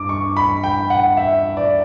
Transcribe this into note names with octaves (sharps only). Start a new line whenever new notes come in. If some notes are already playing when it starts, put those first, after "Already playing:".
Already playing: G2 D6
C#6
B5
G5
F#5
E5
D5